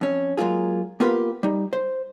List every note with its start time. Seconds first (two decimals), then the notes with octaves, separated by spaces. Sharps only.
0.01 F2 C#4
0.37 F#3 G#3 A#3 F4 G#4
1.00 A#3 B3 F4 G4 A#4 B4
1.43 G3 D#4
1.73 C5